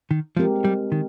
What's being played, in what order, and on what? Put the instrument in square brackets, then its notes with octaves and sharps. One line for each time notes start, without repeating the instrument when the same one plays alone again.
[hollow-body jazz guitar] D#3
[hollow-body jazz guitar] F3 [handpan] G#3 C4 G4 A#4
[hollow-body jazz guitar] G3
D#3